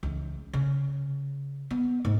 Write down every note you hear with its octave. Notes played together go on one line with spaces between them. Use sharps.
C#2 E3
C#3
B3
G#2